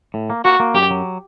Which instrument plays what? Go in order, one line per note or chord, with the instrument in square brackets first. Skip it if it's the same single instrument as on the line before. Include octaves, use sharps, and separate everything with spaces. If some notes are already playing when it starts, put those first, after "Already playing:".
[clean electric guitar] A2
A#3
[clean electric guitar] A#3 [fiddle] F#4
[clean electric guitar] A#3
[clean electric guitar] F#2 [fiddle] G4
[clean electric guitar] F#3